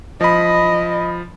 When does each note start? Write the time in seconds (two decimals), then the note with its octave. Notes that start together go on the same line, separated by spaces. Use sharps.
0.21 F3 D#5 B5